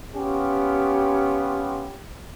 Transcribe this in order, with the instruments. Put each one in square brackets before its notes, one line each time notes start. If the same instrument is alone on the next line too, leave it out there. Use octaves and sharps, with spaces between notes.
[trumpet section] B3 C#4 F4 G4